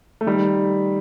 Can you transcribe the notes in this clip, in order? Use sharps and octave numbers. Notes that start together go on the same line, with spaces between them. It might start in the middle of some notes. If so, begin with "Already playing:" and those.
A3
D#3 G3